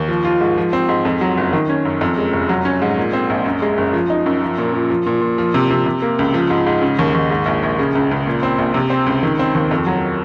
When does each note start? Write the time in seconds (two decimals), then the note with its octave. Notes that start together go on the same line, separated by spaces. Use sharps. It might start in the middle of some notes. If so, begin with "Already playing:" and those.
Already playing: D#2
0.08 F3
0.25 F4
0.41 G#2
0.58 F3
0.73 C4
0.89 G#2
1.05 F2
1.21 F#3
1.38 F#1
1.53 D#3
1.69 C#4
1.85 F#2
2.01 F2
2.18 G#3
2.33 F1
2.49 F#3
2.65 C#4
2.82 G#2
2.98 A#2
3.13 C4
3.30 A#1
3.46 F#2
3.62 G#3
3.78 F#1
3.93 F3
4.10 D#4
4.26 F#2
4.42 F3
4.58 A#2
4.74 A#2
4.90 F3
5.06 A#2
5.21 A#2
5.38 F3
5.54 C3
5.71 C3
5.86 C3
6.02 A#3
6.19 C#2
6.34 F3
6.50 G#2
6.66 G#2
6.82 C#3
6.99 D#2
7.14 D#2
7.31 G#2
7.46 A#1
7.63 A#1
7.79 C#3
7.95 C#2
8.11 C#2
8.27 A#2
8.43 C4
8.58 A#1
8.74 C3
8.90 C4
9.06 C#2
9.23 D#3
9.39 C4
9.55 D#2
9.71 F2
9.86 F#3